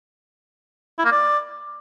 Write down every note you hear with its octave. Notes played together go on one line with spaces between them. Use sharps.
E4
A#3
D5